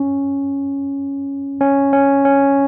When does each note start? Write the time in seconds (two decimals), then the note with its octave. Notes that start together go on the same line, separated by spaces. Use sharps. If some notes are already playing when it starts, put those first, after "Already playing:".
Already playing: C#4
1.61 C#4
1.93 C#4
2.25 C#4